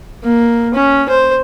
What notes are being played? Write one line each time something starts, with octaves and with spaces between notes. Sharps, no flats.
A#3
C#4
C5